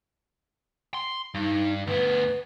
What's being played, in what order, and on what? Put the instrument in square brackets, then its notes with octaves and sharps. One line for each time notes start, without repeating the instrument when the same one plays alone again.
[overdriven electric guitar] C6
[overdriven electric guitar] G2 [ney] D#4
[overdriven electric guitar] D2 B3 [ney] B4